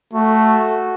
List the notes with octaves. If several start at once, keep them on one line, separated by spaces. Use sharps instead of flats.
A3 F#4